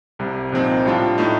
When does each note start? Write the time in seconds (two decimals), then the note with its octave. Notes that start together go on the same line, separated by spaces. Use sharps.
0.19 C2 C3 G3
0.52 C2 A#2 F3 C4 D#4
0.85 A2 G3 D4 F4
1.18 A2 A3 D#4